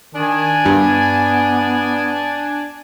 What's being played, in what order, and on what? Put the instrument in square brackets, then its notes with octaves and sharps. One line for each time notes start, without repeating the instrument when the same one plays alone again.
[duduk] D#3 [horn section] D4 G#5
[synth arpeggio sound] G2 [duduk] B3